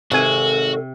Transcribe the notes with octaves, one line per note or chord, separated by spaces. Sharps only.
G#1 C3 F#4 A4 G#5